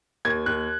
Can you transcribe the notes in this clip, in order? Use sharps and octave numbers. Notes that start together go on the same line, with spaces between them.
D#2 G#6
D#2 F#6